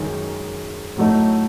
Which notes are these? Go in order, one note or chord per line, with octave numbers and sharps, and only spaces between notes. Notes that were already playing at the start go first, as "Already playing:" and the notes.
Already playing: F#2 D#3 G#3 D#4
A2 F#3 A3 D#4